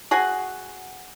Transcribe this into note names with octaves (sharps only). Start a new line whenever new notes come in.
F#4 G#4 F#5 G#5